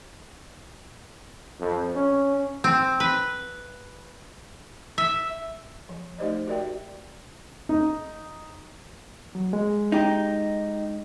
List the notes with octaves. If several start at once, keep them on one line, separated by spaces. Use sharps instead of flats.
F2
C#4
C4
B4
E5
F3
A3 D#4 G4 C5 D5 D#5
F#4 G4 A#4 D5 E5 G5
D#4
F#3
G#3
D#4 G4